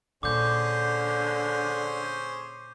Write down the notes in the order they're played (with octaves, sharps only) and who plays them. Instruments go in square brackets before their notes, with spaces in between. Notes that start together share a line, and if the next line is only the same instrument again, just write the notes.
[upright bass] A#2 [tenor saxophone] D3 [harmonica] C#4 G#4 C5 [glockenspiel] D6 G6